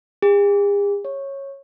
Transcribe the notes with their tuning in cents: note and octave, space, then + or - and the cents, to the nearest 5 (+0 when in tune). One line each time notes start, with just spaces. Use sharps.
G#4 -45
C#5 -10